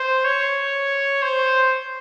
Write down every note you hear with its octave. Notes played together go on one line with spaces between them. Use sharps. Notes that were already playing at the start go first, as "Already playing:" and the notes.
Already playing: C5
C#5
C5